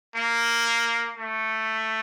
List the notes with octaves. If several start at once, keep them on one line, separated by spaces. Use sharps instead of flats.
A#3
A3